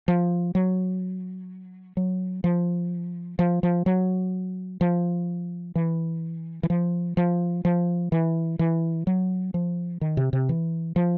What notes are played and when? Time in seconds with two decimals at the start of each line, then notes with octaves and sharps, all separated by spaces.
0.08 F3
0.55 F#3
1.97 F#3
2.44 F3
3.39 F3
3.63 F3
3.86 F#3
4.81 F3
5.75 E3
6.63 E3
6.70 F3
7.17 F3
7.65 F3
8.12 E3
8.59 E3
9.07 F#3
9.54 F3
10.01 D#3
10.17 C3
10.33 C3
10.49 E3
10.96 F3